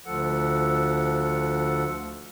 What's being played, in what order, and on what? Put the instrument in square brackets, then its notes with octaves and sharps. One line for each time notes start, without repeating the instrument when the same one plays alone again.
[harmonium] D2 F3 A4 F#5